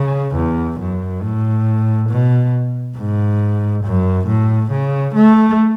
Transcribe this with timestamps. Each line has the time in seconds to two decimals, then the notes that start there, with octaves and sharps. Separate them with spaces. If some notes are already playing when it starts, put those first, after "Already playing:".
Already playing: C#3
0.35 E2
0.80 F#2
1.22 A2
2.09 B2
2.97 G#2
3.84 F#2
4.27 A2
4.71 C#3
5.15 A3